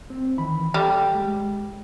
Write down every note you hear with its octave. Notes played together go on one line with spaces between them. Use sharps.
C4
D#3 E3 B5
G3 A4
G#3